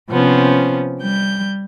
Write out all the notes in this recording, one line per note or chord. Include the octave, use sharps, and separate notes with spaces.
C3 F3 B3 C#4
G3 G6